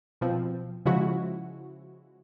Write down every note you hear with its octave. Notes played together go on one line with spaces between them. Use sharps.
B2 F3 C4
C#3 F3 G#3 E4 F#4